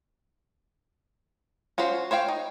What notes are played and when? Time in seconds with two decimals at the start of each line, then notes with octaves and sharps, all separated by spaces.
1.78 C#4 F4 F#4 C5
2.11 C5 C#5 F5 G5
2.28 D#4